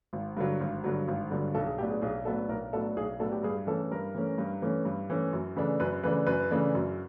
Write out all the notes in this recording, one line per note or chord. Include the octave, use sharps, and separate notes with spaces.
G#1
G2 D3 F#3
G#1
G2 D3 F#3
G#1
G2 D3 F#3
B1 A4
G#4
A2 F#3 B3 D4 G4
G#4
B1 G#4
A2 F#3 B3 D4 A4
B1 A#4
A2 F#3 B3 D4 A4
B1 G#4
A2 F#3 B3 D4 A4
G4
G2 G#4
E3 A3 C#4 A4
G2 A#4
E3 A3 C#4
G2
E3 A3 C#4
G2
E3 A3 C#4
F#2
C#3 E3 A3 D4
F#2 B4
C#3 E3 A3 D4 B4
F#2 B4
C#3 E3 A3 D4
F#2